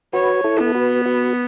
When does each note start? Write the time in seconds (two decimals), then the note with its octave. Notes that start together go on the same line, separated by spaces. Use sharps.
0.13 F#4 B4 C#5
0.44 E4 A4
0.60 B3
0.74 F#4 B4
1.05 F#4 B4